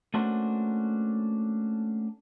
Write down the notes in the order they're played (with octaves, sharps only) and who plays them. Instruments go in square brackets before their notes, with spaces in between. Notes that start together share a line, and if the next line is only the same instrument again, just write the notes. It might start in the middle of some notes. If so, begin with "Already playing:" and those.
[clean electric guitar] A3 A#3 C#4 D4 F#4 C5